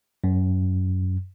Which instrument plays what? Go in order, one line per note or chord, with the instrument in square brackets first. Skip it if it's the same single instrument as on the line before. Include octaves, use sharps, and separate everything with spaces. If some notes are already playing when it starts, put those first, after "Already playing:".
[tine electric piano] F#2